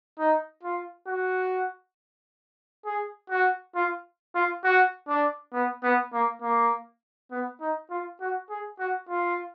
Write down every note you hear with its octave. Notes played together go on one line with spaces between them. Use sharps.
D#4
F4
F#4
G#4
F#4
F4
F4
F#4
D4
B3
B3
A#3
A#3
B3
D#4
F4
F#4
G#4
F#4
F4